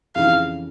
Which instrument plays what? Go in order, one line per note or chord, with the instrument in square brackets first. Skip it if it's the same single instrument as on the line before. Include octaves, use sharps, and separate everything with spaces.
[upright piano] F2 C#3 E3 [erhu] F5